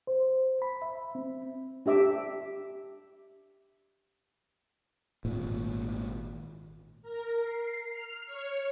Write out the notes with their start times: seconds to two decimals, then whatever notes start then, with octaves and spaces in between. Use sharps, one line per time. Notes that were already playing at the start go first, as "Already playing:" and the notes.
0.07 C5
0.62 B5
0.82 E5
1.15 C4
1.86 D4 G4 E5 D6
5.25 G#1 A#2
7.02 A#4
7.43 C7
7.92 F6
8.26 C#5